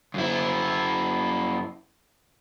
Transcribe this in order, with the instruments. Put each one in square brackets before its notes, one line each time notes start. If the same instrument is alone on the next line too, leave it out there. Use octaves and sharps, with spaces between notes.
[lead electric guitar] F#2 E4